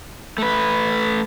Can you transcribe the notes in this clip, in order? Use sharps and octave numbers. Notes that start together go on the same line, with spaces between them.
A3 B4